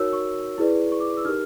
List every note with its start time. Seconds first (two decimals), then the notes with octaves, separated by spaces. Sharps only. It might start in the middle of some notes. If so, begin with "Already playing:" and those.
Already playing: D#4 F#4 A#4 C#5 E6
0.13 C#6
0.58 E4 G#4 B4 D5
0.92 C#6
1.00 D6
1.17 E6
1.25 D#4 G4 A#4 F6